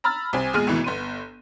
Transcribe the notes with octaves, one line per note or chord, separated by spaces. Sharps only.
A#5 B5 E6 F6 A6
C2 C4 G#5
E2 A#2 G#3 G#4 F6 D#7
G#1 D2 B2 E3
G1 B3 C6 D#7